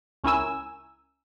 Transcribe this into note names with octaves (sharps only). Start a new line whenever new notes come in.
C#2 C#4 E4 A#4 G#5 E6